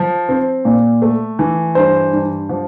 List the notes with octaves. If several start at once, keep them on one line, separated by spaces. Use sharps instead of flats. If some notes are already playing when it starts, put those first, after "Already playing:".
Already playing: F3
C4
A#2
A3
E3
G2 C5
G2
F3